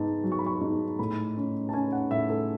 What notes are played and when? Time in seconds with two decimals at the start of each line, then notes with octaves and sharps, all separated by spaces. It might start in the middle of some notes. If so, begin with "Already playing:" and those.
Already playing: G#2 B3 A5
0.24 F#3
0.32 C#6
0.39 B5
0.46 C#6
0.61 G#2
0.99 A2 B5
1.37 C#4
1.69 A5
1.73 C#4 G#5
1.92 F#5
2.11 A2 E5
2.30 A4